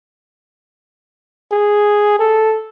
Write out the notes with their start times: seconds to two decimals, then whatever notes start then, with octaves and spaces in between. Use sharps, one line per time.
1.51 G#4
2.19 A4